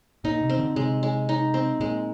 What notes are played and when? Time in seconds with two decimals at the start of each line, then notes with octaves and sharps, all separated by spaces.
0.24 A#2 D#4
0.42 C3
0.50 C4
0.59 D3
0.76 C3 G#3
1.03 G#3
1.29 D#4
1.54 C4
1.80 A#2 G#3